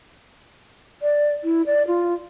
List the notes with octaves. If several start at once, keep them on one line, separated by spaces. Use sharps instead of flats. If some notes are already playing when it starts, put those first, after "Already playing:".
D5
E4
D5
F4